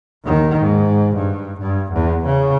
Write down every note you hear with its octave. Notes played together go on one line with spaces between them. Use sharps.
D#2 D#3
G#2
G2
G2
E2
C#3